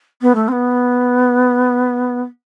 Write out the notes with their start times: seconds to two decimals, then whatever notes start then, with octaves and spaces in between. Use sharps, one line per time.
0.21 B3
0.35 A3
0.48 C4
0.52 B3